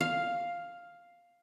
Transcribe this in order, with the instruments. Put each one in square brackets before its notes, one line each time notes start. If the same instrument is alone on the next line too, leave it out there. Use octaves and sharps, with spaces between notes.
[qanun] F5